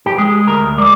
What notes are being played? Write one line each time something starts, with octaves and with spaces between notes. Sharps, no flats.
G4
G#3 G#4
D2 A#4
G#3 D5